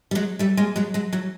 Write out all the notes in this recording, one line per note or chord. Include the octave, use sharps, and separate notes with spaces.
G3
F#3 G#3
G3 A3
G#3 A#3
F#3 G#3
F#3 G#3
E3 F#3